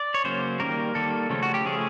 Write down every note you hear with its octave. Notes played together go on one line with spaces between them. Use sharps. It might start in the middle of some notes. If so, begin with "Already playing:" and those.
Already playing: D5
C#5
C#3 F#3 A#3 C#4 C5
D#3 G3 A#3 A#4
D#3 G3 A#3 A4
C#3 F3 A3 C#4
F#4
G4
C#3 F3 A3 C#4 G#4